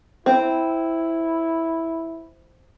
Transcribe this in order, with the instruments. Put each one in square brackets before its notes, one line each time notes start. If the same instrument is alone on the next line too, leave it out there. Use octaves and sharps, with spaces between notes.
[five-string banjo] C4 [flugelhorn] E4